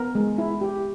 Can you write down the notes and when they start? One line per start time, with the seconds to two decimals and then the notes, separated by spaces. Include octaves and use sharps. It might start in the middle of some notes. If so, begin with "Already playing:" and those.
Already playing: B3 A#4
0.15 G#3
0.38 E4
0.61 G4